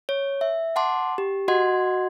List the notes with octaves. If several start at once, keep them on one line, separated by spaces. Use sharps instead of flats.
C#5
E5
F#5 A5 C6 D6
G4
F#4 D#5 F#5 C6 G#6